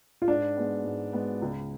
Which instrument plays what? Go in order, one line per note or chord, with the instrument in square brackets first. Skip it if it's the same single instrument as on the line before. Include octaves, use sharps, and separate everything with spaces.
[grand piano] F4
[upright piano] G#2 [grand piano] D4
[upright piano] G#3 B3
G#2
G#3 B3
C#2